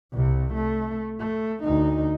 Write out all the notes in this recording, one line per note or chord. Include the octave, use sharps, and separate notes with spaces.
C2 C3
A3
A3
D2 D#4